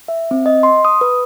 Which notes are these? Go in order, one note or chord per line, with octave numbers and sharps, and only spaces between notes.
E5
C4
D#5
C6
D#6
B4